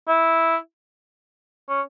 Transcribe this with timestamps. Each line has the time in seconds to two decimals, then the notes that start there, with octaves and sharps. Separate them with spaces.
0.08 E4
1.69 C#4